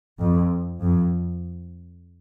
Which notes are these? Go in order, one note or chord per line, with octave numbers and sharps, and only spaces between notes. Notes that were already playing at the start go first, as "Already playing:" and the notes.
F2
F2